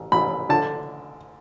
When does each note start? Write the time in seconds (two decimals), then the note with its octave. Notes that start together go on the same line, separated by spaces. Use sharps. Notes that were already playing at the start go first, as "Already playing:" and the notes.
Already playing: A1
0.12 A1 B5
0.49 D3 A5